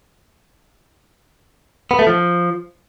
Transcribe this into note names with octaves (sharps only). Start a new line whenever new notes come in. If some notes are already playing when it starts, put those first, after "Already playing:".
B3
A3
F3